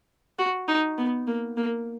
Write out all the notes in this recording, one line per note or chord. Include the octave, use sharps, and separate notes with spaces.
F#4
D#4
B3
A#3
A#3